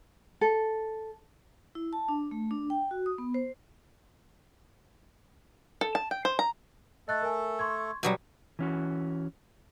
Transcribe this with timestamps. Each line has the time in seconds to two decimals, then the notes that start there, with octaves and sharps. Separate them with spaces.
0.41 A4
1.75 E4
1.93 A5
2.08 D4
2.31 A3
2.51 D4
2.70 G5
2.91 F#4
3.06 D#6
3.18 B3
3.34 C5
5.81 A4
5.95 A5
6.11 G5
6.25 C5
6.39 A#5
7.08 A3 A4 D#5 F#6 A6
7.22 A#4 G#5
7.59 C6 C#6 G#6
8.03 B2 F#3 G3 B3
8.59 E3 C#4 F#4